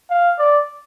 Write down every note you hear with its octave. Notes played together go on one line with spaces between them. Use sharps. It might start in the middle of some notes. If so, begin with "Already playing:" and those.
F5
D5